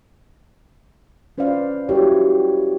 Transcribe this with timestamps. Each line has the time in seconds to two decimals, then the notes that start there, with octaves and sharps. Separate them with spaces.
1.38 C#4 B4 C5 D5 F5
1.89 E4 F#4 G4 A#4 C#5